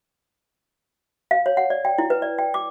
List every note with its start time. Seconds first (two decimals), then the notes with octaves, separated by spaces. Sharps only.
1.31 F5
1.46 C#5
1.57 F#5
1.70 D5
1.85 G5
1.98 E4
2.10 B4
2.22 D5
2.39 G5
2.54 D6